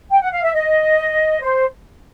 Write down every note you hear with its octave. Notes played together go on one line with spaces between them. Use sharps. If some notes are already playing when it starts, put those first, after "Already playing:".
G5
F#5
F5
E5
D#5
C5